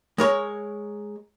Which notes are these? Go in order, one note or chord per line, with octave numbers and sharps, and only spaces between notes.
G#3 A#4 C#5